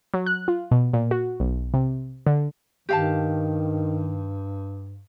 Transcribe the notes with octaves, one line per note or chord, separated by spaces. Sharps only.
F#3
F#6
F4
B2
A#2
F#4
B1
C3
D3
G2 D#3 G4 F5 A5